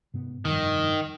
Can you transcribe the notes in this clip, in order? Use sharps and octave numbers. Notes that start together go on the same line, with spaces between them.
G#2 C3 B3
F1 G2 D#3 F3